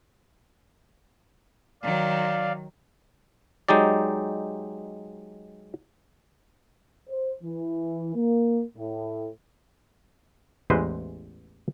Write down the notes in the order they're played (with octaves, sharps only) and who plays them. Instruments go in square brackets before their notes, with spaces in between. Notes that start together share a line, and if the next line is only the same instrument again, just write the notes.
[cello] D#3 F#3 [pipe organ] D5 F5
[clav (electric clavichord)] F#3 G#3 D#4 G4 D5
[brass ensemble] C5
E3
A#3
A2
[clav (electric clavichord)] A1 E2 E3 G#3 B4 C5